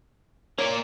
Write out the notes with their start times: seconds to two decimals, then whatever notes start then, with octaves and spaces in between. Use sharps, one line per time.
0.58 A#3 C#5 D5